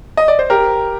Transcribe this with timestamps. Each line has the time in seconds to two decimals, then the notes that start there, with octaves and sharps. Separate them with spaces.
0.17 D#5
0.28 D5
0.39 C5
0.50 G4 A#4